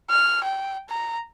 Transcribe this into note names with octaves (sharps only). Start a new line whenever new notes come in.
F6
G5
A#5